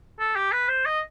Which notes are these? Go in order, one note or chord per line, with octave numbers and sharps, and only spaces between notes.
A4
G4
B4
C5
D#5